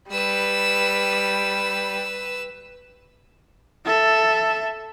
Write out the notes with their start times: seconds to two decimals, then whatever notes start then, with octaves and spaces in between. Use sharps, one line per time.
0.11 G3 B4 E6
3.85 A4 E5